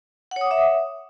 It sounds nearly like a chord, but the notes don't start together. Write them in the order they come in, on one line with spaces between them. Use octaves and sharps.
F#5 C#5 D#6 D6 E5